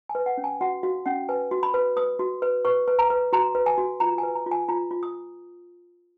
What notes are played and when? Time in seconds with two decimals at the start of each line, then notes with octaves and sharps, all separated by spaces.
0.09 G#5
0.15 B4
0.26 F#5
0.37 C#4
0.44 G#5
0.61 F#4 F#5
0.83 F#4 F5
1.06 C#4 F#5
1.29 B4 G#5
1.51 F#4
1.63 B5
1.74 B4
1.96 B4 D#6
2.19 F#4
2.42 B4
2.65 B4 C#6
2.88 B4
2.99 A#5
3.10 B4
3.33 F#4 A#5
3.55 B4
3.66 G#5
3.78 F#4
4.00 F4 A#5
4.18 G#5
4.23 B4
4.35 A#5
4.46 F4
4.51 G#5
4.68 F4 A#5
4.91 F4
5.03 D#6